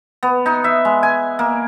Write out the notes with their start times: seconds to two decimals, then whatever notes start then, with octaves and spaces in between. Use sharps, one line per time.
0.23 B3
0.46 D#4
0.64 E5
0.85 G#3
1.03 G#5
1.39 A#3